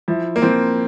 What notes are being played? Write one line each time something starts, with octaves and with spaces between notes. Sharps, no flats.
F3 E4
A#3
F3 C4